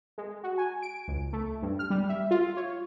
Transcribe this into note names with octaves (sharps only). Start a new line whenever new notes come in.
G#3
F#4
G#5
D7
C#2
A3
G2
F6
G3
E5
F4
C#5